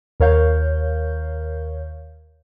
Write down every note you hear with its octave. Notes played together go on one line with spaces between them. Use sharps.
D#2 A#4 C#5 F5 G6